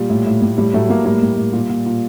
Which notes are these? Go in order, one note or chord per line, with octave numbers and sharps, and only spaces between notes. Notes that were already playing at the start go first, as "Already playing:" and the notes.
Already playing: A#2 G3
A2
A2
A2
A2 G3
A2 F#3 A3
A2 G3 A#3
A2 G3 A#3
A2
A2
A#2 G3
A#2
A#2